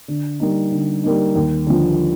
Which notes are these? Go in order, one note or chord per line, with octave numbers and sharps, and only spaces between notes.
D3
G3 A#3 D#4
D3
G3 A#3 D#4
D#2
D3 F3